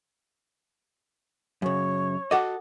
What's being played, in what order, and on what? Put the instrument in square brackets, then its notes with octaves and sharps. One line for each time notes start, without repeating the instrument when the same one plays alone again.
[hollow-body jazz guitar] F#2 C#3 [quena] C#5
[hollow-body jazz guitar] F#4 A4 D#5 [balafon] F#5 D6